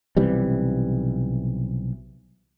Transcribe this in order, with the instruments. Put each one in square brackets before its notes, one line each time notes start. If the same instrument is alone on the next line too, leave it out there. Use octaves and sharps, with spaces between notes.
[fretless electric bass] B1 C3 E3 G3